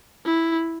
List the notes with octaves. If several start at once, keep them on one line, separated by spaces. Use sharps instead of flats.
E4